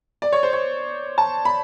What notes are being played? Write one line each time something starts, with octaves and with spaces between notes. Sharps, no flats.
D5
C#5
C5
C#5
A5
B5